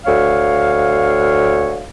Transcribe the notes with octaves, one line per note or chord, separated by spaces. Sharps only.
D2 C#5 F5